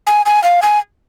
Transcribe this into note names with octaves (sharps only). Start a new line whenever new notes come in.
G#5
G#5
F5
G#5